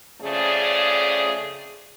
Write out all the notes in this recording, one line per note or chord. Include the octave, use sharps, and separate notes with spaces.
F2 C#3 A3 G#4 D5